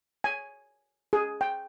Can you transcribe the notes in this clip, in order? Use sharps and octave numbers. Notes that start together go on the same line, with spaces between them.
G#5
G#4
G5